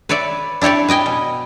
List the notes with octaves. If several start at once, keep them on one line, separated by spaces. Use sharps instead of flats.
B4 C#5 D5 E5
D4 E4 G4 C#5 D5
B4 D#5 G5 G#5
B2